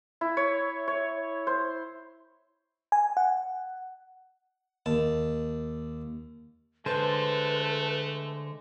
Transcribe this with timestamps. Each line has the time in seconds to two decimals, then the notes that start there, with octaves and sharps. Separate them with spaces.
0.21 E4
0.37 C#5
0.88 C#5
1.47 C5
2.92 G#5
3.17 F#5
4.86 D#2 A5
6.86 D3 G#3 A3 A4 B4 C5